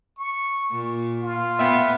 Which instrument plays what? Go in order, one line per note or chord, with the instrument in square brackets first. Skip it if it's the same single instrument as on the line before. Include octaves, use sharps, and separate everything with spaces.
[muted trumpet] C#6
[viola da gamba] A#2
[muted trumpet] F4
[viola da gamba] B3 [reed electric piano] E5 G5 B5